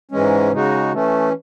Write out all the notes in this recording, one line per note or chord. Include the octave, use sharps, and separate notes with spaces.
G#2 E3 G#3 C#4
C#3 G#3 D#4 F#4
E3 A3 C#4